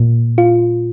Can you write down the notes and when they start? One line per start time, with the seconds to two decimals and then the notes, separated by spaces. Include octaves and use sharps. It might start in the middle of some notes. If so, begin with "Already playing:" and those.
Already playing: A#2
0.38 F4